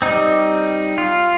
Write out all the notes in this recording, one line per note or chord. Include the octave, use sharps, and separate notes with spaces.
G3 C4 D#4
F4